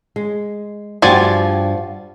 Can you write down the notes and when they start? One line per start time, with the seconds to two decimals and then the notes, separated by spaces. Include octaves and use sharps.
0.16 G#3
1.02 G2 F3 F#4 G4 D5 G#5